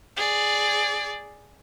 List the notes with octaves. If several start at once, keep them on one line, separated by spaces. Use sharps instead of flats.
G#4 D5